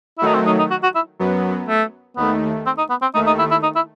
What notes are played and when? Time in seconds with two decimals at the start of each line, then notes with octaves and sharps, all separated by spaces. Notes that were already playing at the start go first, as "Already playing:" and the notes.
0.18 E4
0.22 D#3 F#3 A3 D#4
0.34 C4
0.46 D#4
0.58 D#4
0.70 F#4
0.83 F#4
0.95 E4
1.19 F#2 F#3 B3
1.68 A3
2.17 D#2 D#3 A3 B3
2.66 C4
2.78 D#4
2.90 B3
3.02 C4
3.14 D#2 D#3 A3 D#4
3.27 D#4
3.39 E4
3.51 E4
3.63 D#4
3.75 E4